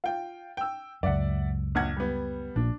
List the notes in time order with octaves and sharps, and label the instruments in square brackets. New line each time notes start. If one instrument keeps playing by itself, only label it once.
[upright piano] F4 G5
G5 E6
[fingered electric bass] C#2 F#2 [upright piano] D5 E5 F#5
[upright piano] A#1 F#5 G#6
G3 B3
[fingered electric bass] A#1 A#2 [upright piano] D4